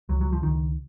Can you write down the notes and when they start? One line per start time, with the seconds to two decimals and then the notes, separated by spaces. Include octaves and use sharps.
0.09 C#2 F#3
0.21 F#3
0.32 F3
0.43 C#2 D#3